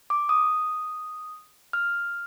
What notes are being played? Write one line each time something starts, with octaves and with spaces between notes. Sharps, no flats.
D6
D#6
F6